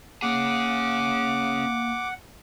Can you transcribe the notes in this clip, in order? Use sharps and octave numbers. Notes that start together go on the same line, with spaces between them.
A#3 C#4 G#4 F#5 D6